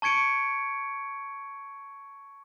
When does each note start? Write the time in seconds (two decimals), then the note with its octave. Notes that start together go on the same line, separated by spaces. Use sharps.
0.02 A5 C#6 G#6 C#7 D7